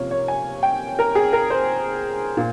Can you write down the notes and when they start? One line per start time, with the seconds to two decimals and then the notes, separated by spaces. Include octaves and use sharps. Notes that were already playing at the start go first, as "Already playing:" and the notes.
Already playing: C3 F3 A#3 C#4 C#5
0.11 C#5
0.28 G#5
0.63 G5
0.99 A#4
1.15 G#4
1.33 A#4
1.50 C5
2.37 A#2